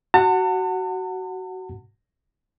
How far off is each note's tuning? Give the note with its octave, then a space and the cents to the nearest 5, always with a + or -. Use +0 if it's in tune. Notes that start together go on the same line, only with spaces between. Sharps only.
F#4 +15 F#5 +0 A5 +40